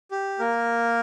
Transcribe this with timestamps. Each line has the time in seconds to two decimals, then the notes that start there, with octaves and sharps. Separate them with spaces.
0.11 G4
0.39 A#3 A#4